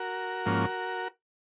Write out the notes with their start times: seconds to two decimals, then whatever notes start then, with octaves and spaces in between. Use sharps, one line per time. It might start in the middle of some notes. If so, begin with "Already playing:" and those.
Already playing: F#4 A#4
0.46 G#2 F3 A#3 C#4